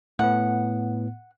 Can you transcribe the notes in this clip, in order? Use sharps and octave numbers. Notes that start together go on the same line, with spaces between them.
A2 B3 F#5